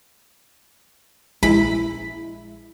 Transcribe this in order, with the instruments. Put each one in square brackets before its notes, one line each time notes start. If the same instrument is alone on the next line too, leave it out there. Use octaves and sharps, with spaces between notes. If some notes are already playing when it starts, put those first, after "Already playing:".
[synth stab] A#1 G#3 E4 [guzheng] B5